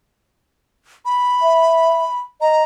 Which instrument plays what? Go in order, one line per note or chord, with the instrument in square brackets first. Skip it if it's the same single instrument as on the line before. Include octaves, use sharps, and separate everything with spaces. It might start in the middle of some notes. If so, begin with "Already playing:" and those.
[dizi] B5
[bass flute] E5
[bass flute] D#5 [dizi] A#5